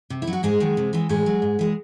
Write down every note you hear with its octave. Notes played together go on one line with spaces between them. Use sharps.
C3
E4
F#3
F#4
G#2 G#3 G#4
D#3 F#3
C3
E3 G#3
A2 G#3 G#4
F#3
G#2
E3 G#3